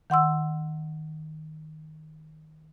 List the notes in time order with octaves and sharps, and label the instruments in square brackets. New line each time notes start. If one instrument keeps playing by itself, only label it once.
[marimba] D#3 F#5 C6 E6